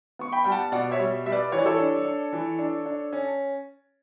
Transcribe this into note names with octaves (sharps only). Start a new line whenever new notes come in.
B3 C#6
G5 B5
G3 G5
F#5 A5
B2 D5 F#5
C#5 E5
G3
G3 E5
B4 D5
E3 C#5
D5
A4 C#5
D4
D4
E3
D4
D4
C#4